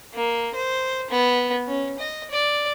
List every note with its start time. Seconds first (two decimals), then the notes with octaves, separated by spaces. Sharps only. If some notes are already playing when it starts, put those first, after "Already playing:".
0.14 A#3
0.55 C5
1.10 B3
1.67 C#4
1.99 D#5
2.31 D5